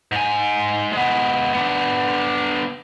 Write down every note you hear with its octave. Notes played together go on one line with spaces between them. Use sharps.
G#2 G#5
G#3 B3
B3 D4